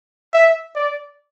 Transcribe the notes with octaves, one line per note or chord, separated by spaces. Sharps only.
E5
D5